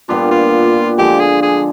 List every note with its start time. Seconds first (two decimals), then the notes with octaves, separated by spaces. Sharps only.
0.09 A#2 G3 B3 D4 F4
0.31 F4
0.98 D3 F3 G#3 G4
1.20 G#4
1.42 G#4